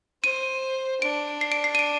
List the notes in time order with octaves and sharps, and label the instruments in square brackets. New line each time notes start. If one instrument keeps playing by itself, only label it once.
[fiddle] C5 [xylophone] D#7
[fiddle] D4 [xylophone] D7
[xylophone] C7
D7
C7
D#7
D7